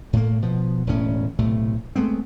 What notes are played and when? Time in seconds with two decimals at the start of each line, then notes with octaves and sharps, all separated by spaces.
0.13 A2 A3 A#3
0.42 B2 F3 B3
0.87 E1 D2 A2 C#4
1.39 B1 A2 C3 A3
1.96 G#3 A3 B3 C4